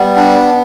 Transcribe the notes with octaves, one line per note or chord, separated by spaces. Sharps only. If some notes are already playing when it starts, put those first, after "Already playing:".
Already playing: G3 B3
D4